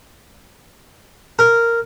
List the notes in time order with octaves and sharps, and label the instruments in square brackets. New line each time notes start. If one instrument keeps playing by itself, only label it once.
[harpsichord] A#4